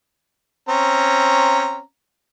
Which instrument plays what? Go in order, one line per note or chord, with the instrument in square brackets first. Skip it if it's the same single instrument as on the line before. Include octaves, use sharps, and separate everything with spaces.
[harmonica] C4 C#4 A#5